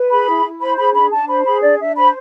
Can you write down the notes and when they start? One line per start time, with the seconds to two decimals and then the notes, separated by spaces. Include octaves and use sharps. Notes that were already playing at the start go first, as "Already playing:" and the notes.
Already playing: B4
0.10 G#4 B5
0.28 E4
0.45 E4
0.61 C5 B5
0.77 G#4 B5
0.94 D4 B5
1.12 D4 A5
1.29 C5 B5
1.45 G#4 B5
1.63 D4 D5
1.79 D4 E5
1.96 C5 B5